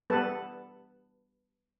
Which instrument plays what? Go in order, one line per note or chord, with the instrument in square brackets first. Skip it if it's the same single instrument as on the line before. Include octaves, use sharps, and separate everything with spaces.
[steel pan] G3 B3 A4 B4 A5